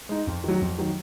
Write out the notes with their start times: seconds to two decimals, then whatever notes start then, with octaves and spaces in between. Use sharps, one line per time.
0.09 G#3 D#4
0.27 F2
0.44 D#3 F#3
0.61 F2
0.78 D#3 F#3